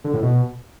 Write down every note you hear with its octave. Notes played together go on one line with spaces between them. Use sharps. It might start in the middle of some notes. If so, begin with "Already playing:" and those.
D3
A2
B2